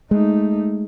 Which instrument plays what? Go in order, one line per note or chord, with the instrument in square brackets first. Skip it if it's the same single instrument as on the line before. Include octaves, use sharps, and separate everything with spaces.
[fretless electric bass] G#3 [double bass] A3 D#4